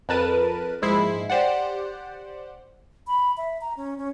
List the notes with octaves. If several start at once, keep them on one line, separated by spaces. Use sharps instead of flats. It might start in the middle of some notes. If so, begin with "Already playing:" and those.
F2 A#4 B4 A5 D#7
A#1 G#2 G#3 E4 C7
G4 C5 D5 F#5
B5
E5
A#5
C#4
C#4